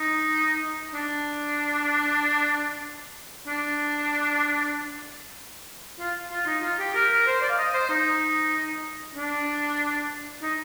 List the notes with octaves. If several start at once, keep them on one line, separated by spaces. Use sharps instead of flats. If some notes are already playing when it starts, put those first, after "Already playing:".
Already playing: D#4
D4
D4
F4
F4
D#4
F4
G4
A#4
A#4
C5
D5
F5
D#5
C5
D#4
D4
D#4